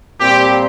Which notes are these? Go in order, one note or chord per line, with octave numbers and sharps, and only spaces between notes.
A#2 G3 C4 G4